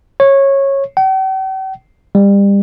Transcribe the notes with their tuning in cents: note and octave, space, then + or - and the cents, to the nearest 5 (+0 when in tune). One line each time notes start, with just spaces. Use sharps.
C#5 -15
G5 -45
G3 +30